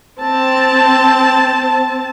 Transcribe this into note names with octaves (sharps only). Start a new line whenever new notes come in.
C4 A5